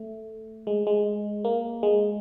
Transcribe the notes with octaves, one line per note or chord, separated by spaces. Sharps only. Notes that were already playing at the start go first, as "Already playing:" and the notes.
Already playing: A3
G#3
G#3
A#3
G#3